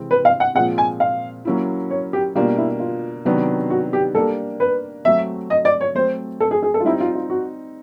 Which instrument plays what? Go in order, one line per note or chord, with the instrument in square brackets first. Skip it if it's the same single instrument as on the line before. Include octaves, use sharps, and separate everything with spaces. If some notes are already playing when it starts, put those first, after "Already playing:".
Already playing: [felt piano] C3 E3 G#3 C4
[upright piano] B4
F5
F#5
[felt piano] A#2 F3 G#3 C4 [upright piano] F#5
[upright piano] G#5
F5
[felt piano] F#3 A#3 C#4 E4
[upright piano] C#5
G4
[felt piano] B2 G3 A#3 D4 [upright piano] F4
[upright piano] E4
F4
[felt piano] C3 D#3 F#3 B3 D4
[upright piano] F#4
G4
[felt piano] G3 A#3 D4 [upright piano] A4
[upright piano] B4
[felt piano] F#3 A3 C4 [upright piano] E5
[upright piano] D#5
D5
C#5
[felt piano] F#3 A3 C4 [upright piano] C5
[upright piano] A4
G#4
G#4
A4
F4
[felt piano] G3 C4 D#4 [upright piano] E4
[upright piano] F4
F4
F#4